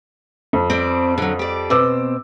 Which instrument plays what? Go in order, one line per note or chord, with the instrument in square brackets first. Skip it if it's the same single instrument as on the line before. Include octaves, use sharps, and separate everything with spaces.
[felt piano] F2
[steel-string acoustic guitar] C4 D5
D3 F#3
G4 D5
[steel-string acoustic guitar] B2 C4 [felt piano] D6 E6